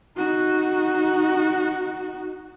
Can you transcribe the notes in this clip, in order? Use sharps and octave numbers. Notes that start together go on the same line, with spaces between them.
D#4 F#4